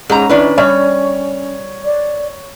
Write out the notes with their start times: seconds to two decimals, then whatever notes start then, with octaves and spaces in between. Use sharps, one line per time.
0.10 G#2 G#3 C#4 A#5
0.29 D#3 D4 E4 B4
0.58 G3 C#5
1.85 D5